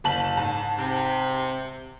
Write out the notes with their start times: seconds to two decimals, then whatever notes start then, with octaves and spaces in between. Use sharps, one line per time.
0.04 F#1 A5 F#7
0.37 G#2 A5
0.78 C3